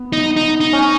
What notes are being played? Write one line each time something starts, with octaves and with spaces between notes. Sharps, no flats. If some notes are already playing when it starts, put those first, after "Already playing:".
Already playing: B3
D#4
D#4
D#4
C#4